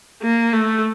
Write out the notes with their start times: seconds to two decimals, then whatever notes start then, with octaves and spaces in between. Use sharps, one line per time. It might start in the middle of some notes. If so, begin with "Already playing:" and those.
0.22 A#3
0.53 A3